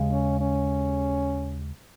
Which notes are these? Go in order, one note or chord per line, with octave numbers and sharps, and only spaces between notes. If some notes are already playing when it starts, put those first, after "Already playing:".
Already playing: D#2 C#3 G#3
C#4
C#4